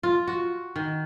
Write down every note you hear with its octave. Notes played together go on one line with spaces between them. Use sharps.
F4
F#4
D#3